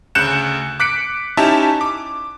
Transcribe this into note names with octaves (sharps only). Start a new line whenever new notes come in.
D2 C#3 F#6 G6 C#7 E7
D6 F#6 B6 C#7 D7
C#4 D#4 E4 G4 E5 A5
D6